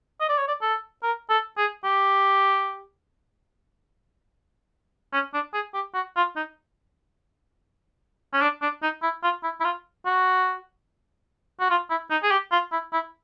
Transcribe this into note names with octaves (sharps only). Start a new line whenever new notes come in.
D#5
D5
C#5
D5
A4
A#4
A4
G#4
G4
C#4
D4
G#4
G4
F#4
F4
D#4
C#4
D4
D4
D#4
E4
F4
E4
E4
F4
F#4
F#4
F4
E4
D#4
G#4
G4
F4
E4
E4